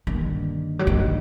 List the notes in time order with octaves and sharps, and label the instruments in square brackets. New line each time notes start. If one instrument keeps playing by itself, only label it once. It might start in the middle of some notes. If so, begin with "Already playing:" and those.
[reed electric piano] G2 D3 G3 A#3 D4 [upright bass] D#3
[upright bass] F#3
[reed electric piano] G2 D3 G3 A#3 D4 [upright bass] D#3